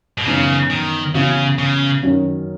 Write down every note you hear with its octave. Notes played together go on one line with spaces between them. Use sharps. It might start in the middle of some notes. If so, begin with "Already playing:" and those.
B2
F#2 C#3 E3 B3 D#4
D#3
C#3 E3 B3 F#4
C#3
F#2 D#3 F#3 C#4 F#4